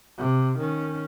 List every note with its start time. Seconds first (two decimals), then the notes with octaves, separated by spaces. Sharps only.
0.18 C3
0.58 D#3 C#4